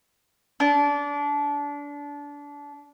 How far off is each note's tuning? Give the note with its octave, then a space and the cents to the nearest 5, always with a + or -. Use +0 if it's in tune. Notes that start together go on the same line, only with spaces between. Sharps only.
D4 -25